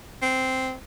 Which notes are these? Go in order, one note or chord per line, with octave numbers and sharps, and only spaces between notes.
C4